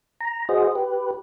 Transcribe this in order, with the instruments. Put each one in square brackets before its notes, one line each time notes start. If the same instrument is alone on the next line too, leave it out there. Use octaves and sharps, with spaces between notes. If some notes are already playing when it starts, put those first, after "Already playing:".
[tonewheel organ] A#5
F#4 G#4 C5 D#5
G4 B4